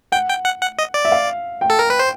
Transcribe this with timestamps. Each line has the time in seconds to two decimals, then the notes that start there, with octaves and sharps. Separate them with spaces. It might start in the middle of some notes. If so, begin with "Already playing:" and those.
0.12 F#5 G5
0.29 G5
0.45 F#5
0.61 F#5
0.79 D#5
0.94 D5
1.05 E5
1.12 F5
1.61 G5
1.70 A4
1.79 A#4
1.90 B4
1.99 C5